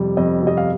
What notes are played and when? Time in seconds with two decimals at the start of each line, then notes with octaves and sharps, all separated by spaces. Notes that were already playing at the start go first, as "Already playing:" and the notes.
Already playing: F2 C3 G3
0.17 F2 D#5
0.42 C3 G3 D#5
0.57 F5